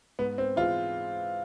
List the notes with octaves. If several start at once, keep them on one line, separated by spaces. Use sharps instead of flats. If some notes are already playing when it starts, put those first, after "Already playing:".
G#2 B3
C4
E3 G#3 F4